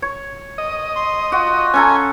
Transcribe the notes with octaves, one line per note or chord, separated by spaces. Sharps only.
C#5
D#5
C6
F4 F#4
C#4 A4 G#5 A#5